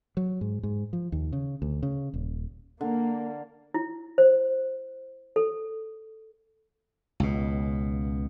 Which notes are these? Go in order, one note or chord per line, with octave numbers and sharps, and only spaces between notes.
F#3
G#2
G#2
F3
D#2
C#3
D2
C#3
D#1
D3 A#3
E4
C5
A4
C#2 B2